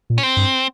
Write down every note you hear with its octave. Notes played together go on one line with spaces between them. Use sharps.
A#2
C#4
C4
G2